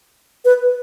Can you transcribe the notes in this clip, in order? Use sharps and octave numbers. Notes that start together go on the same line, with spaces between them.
B4